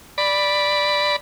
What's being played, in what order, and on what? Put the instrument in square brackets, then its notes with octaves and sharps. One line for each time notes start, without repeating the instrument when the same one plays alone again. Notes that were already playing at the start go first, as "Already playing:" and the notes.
[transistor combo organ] D5 B5